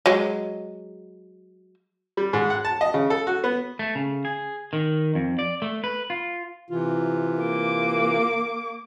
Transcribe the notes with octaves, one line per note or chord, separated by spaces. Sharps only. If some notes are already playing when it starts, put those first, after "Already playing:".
F#3 G#3
G3
G#2
F#5
A5
D#5
C#3
A4
F#4
B3
A3
C#3
G#4
D#3
F2
D5
A3
B4
F4
C3 E3 F4
A#3 D6